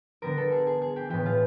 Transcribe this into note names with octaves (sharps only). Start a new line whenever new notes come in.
D3 G3 B3 A#4
A4
G#4
G#4
G#4
G4
A2 E3 G#3 B3 G4
F4